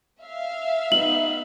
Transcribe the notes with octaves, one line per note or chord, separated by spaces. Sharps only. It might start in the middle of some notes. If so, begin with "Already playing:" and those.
E5 F5
B3 D#4 F#7